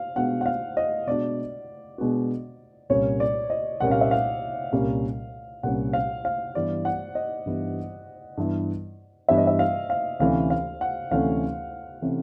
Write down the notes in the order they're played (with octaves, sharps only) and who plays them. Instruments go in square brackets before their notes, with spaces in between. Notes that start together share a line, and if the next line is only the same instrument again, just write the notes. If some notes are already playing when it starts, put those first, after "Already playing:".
Already playing: [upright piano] F5
[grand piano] B2 G#3 B3 D4 F#4 [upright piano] F#5
[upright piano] F#5
F5
D#5
[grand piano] B2 G#3 B3 D4 F#4 [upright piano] D5
[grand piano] B2 G#3 B3 D4 F#4
[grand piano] C2 A#2 G3 A#3 C#4 [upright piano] C#5
[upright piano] D5
D#5
[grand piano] C2 A#2 G3 A#3 C#4 [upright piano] F#5
[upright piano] F5
E5
F5
[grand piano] C2 A#2 G3 A#3 C#4
[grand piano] C2 A#2 G3 A#3 C#4 [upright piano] F#5
[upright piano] F5
F5
[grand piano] G2 E3 G3 B3 E4 [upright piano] D5
[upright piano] F#5
D#5
[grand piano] G2 E3 G3 B3 E4
G2 E3 G3 B3 E4
[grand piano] G2 E3 G3 B3 E4 [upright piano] E5
[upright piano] D#5
E5
F5
F5
[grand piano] D2 C3 E3 A3 C#4 [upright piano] F5
[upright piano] F5
F#5
[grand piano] D2 C3 E3 A3 C#4 [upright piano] F5
[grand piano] C3 E3 A3 C#4